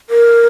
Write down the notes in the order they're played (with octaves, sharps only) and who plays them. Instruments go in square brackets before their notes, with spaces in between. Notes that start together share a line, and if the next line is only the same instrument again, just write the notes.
[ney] A#4